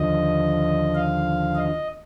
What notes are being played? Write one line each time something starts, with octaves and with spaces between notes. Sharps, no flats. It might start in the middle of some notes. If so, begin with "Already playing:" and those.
Already playing: D#2 D3 F3 D#5
F5
D#5